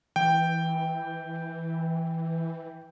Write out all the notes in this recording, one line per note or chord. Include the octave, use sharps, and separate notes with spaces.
E3 G5